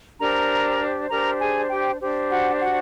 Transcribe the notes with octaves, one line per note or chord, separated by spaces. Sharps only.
D4 G4 A#4 C5 A#5
D4 G4 A#4 C5 A#5
G#4 G#5
G4 G5
D4 G4 C5
F#4 F#5
F#4 F#5